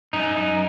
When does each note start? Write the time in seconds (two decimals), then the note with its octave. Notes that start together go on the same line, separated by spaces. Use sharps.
0.13 F#2 D#4
0.37 D#4